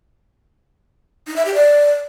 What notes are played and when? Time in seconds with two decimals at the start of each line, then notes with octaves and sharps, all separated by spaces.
1.27 D#4
1.36 E5
1.45 G4
1.54 D5